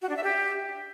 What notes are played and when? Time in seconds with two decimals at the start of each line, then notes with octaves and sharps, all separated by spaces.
0.02 F#4
0.09 D4
0.16 E5
0.24 G4